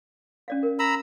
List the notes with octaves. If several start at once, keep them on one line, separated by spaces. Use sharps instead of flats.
C#4 D5 F5
A#4
A#5 B5 E6